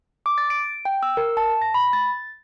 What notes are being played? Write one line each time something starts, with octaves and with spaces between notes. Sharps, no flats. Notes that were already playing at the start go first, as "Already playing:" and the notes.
D6
A6
D7
G5
E6
A#4
A5
A#6
B5
A6